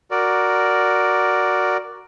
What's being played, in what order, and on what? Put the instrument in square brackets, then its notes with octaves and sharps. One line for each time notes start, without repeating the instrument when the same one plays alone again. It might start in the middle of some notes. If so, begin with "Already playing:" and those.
[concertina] F#4 A#4 D5